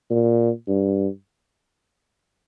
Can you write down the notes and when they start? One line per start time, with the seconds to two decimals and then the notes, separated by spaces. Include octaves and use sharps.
0.10 A#2
0.68 G2